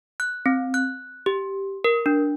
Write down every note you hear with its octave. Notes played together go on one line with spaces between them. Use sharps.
F#6
C4
F#6
G4
A#4
D4